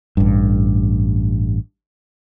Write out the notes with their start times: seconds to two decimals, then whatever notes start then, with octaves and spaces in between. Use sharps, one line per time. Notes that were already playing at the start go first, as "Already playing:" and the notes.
0.17 A1 G2